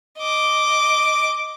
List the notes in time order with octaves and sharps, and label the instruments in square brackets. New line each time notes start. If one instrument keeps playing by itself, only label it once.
[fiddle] D#5 D6